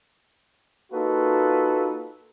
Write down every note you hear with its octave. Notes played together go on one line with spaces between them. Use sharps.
A#3 D#4 F4 F#4 A4 B4